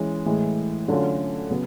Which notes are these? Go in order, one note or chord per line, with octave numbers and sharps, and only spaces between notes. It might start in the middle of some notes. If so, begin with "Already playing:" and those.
Already playing: E3 G#3 C#4
A2 E3 G#3
D3 F#3 A3 C#4 F4
C#3 F#3 B3